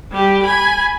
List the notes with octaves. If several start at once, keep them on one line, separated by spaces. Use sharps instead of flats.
G3 G4
G#5 B5